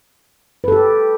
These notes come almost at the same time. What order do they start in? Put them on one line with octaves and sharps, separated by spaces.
B4 A4 G4